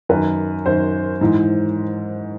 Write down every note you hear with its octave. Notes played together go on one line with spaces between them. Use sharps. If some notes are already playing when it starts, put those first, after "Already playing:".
F#2 D#3 B4
F#2 D#3 C5
G#2 E3